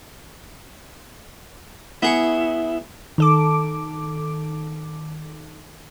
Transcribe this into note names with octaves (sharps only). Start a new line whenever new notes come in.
B3 E4 G#4 C#6
D#3 A4 D6